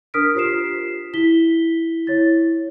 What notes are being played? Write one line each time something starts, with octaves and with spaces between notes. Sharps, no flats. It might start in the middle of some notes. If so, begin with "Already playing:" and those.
D4 A#4 D#6 F6 B6 D7
F4 G4 C5 B6 C7 E7
E4 B6 G7
E4 C#5 A6